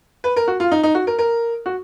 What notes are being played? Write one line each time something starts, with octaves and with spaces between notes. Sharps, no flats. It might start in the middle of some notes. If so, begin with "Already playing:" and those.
B4
A#4
F#4
F4
D#4
D#4
F#4
A#4
A#4
F#4